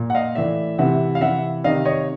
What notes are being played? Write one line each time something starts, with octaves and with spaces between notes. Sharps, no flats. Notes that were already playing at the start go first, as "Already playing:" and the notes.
Already playing: A#2
F#5
D#5 F5
A2 E3 D5 E5
C3 E3 E5 F#5
F5
C3 E3 E5 F#5
C3 D#3 D#5 F5
C#5 D#5